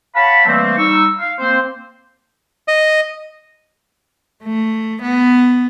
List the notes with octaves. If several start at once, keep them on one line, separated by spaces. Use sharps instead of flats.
C#5 F5 F#5 A5 B5
E3 G3 A3 A#3 C4
G3 D#4 C#6 E6
F5
A#3 C4 C5
D#5
A3
B3